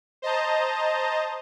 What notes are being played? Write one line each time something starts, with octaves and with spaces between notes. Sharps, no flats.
C5 D#5 A5 A#5